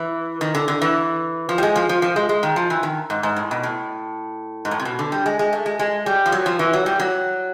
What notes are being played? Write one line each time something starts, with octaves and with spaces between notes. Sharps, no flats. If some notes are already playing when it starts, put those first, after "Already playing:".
Already playing: E3
D#3
D3
D3
E3
F3
G3
G#3
F3
F3
F3
G#3
G#3
D#3
F3
E3
D#3
G#2
G#2
A2
B2
A2
G#2
A2
C3
B2
D3
G3
G#3
G#3
A3
G#3
G#3
G3
F3
F#3
F3
E3
F#3
G3
F#3